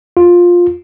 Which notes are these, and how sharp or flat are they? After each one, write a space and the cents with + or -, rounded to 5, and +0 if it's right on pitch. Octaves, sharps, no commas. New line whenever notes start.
F4 +10